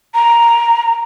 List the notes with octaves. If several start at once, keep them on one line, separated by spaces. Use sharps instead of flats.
A#5